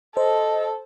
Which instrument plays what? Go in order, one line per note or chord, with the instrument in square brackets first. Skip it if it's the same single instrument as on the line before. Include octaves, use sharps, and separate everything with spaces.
[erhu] A4 [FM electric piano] C5 [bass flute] D#5